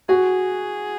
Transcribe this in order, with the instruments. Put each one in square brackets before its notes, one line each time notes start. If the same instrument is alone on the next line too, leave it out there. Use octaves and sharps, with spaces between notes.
[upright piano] F#4 [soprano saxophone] G#4